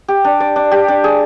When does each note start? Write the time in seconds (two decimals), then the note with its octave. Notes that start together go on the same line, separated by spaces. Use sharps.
0.08 G4
0.25 D4
0.40 D5
0.56 D4
0.71 G4
0.88 D4
1.04 G#4